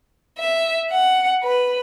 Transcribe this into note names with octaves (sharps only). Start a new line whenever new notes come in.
E5
F#5
B4